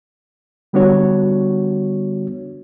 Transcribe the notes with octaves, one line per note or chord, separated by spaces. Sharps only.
D3 G3 B3 D4 F#4 C#5